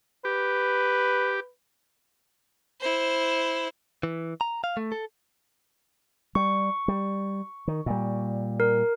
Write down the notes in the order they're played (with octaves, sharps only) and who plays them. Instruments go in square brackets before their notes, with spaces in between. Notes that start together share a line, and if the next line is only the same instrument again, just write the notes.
[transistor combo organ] G4 [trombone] B4
[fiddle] E4 C5
[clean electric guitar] E3
A#5
F5
A3
A4
[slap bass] G3 [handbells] C#6
[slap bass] G3
D#3
A#2 G3
[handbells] A#4